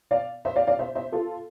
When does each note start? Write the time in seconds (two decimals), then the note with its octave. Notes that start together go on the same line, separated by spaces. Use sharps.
0.11 D5 F5
0.45 C5 E5
0.56 D5 F5
0.67 D5 F5
0.79 C5 E5
0.95 C5 E5
1.12 F4 A4